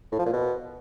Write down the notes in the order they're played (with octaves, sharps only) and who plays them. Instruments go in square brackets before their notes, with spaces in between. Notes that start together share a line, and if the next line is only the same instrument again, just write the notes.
[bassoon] A2
F3
A#2
B2